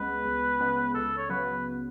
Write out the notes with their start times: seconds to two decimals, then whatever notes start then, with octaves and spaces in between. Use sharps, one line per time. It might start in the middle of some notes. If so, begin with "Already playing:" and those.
Already playing: C#2 C#3 G#3 B3 B4
0.25 C#2
0.60 C#3 G#3 B3
0.94 C#2 A4
1.18 C#5
1.30 C#3 F#3 B3 B4